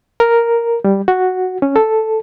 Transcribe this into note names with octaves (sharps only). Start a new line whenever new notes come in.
A#4
G3
F#4
C#4
A4